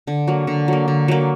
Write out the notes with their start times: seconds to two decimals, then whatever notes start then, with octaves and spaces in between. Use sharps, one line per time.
0.07 D3
0.28 F#3 A#3
0.47 D3
0.68 F#3 A#3
0.88 D3
1.08 F#3 A#3